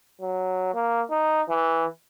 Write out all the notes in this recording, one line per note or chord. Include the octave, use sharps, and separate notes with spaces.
F#3
A#3
D#4
E3